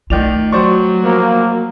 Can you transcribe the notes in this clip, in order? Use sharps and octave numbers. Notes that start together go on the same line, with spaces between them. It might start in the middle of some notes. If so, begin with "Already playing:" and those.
D#3 A3 F4 D5 F7
F#3 C5 D5 C#6
F3 A#3